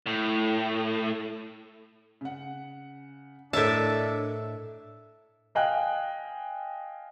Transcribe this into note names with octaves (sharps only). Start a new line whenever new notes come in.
A2
C#3 F#5
A2 D4 A#4 C#5 D#5 E5 A5
D#5 F5 G5 G#5 F#6